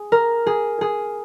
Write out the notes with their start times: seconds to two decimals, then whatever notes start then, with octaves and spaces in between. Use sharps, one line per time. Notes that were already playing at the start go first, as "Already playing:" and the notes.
Already playing: G#4
0.12 A#4
0.47 G#4
0.81 G#4